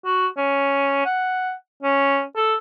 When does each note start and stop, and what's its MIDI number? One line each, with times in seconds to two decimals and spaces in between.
0.05 0.27 66
0.37 1.03 61
1.05 1.53 78
1.83 2.23 61
2.36 2.55 69